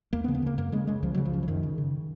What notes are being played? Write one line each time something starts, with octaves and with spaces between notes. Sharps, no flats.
D#2 A#3
B3
C#3
B3
C#3 A#3
F#2 A#3
C#3 G#3
C#3 G#3
C#2 F3
C#3 F#3
F3
C#3
F3
F#2 D#3
C#3
C#3